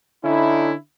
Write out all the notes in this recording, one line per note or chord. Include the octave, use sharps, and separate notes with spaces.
D3 C#4 D#4 E4